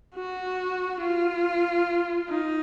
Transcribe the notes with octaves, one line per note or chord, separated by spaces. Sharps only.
F#4
F4
D#4